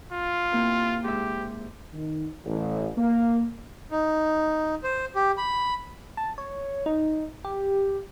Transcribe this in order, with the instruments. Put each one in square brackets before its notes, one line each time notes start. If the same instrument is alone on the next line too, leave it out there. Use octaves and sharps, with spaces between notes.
[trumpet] F4
[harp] C3 A#3 E4
[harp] G#2 E5 [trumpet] G4
[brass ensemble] D#3
A1
A#3
[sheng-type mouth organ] D#4
C5
G4
B5
[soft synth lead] A5
C#5
D#4
G4